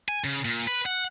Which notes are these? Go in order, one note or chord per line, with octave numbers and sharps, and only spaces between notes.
G#5
C#3
A#2
B4
F#5